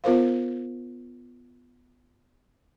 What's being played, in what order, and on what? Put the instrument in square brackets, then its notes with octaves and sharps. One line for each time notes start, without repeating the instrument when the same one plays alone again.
[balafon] B3 F4 A#4 C5 F5